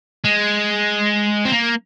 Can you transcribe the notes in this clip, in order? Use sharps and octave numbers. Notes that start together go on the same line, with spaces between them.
G#3
C4
A#3